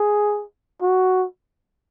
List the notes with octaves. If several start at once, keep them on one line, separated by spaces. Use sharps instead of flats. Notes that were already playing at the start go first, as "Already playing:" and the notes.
Already playing: G#4
F#4